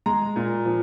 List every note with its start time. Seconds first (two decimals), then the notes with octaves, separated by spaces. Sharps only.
0.06 G#3 A#5
0.36 A#2
0.65 F3